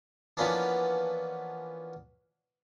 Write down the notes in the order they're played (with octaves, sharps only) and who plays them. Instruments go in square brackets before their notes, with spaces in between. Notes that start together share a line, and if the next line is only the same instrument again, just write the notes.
[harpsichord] E3 F3 A#3 B3 C#4 D4